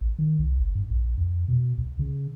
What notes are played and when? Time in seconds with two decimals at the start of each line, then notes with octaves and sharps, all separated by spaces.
0.01 A1
0.19 D#3
0.39 C2
0.58 G1
0.75 G2
0.90 A#1
1.18 F2
1.48 B2
1.78 C#2
1.99 C#3